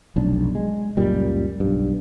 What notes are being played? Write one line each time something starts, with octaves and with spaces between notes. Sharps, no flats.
F1 B1 D4
G#3
C#2 F#2 A#2 G3
B1 G2